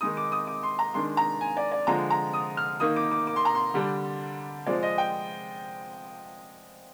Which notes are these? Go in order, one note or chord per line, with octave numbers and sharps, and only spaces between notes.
D#3 G#3 D#4 D#6
D6
D#6
D6
C6
A#5
D#3 G#3 D4 C6
A#5
G#5
D5
D5
D3 F3 G#3 A#5
A#5
D#6
F6
D#3 A#3 D#4 D#6
D6
D6
D6
C6
A#5
C6
D3 G3 D4
C3 F3 G#3 C4 D5
D#5
G5